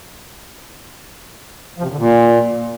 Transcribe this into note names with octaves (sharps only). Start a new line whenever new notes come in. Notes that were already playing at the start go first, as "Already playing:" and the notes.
F3
C3
F#2
D3
A#2